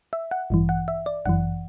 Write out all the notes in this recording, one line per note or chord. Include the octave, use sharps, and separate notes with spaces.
E5
F#5
A1 G2 E3
F#5
E5
D5
G1 F#2 E3 F#5